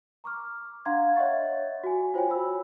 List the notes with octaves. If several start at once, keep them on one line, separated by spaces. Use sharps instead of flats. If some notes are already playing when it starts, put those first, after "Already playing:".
A#5 C#6 D6 F6
D4 F5 F#5 A#5 C6 G#6
C#5 D#5 E5 F#5 C#6 A6
F#4 G#5
F4 C5 C#5 G5 G#5
F#4 B5 E6